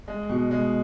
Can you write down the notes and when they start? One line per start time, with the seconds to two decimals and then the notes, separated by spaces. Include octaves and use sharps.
0.08 G#3
0.29 B2
0.51 G#3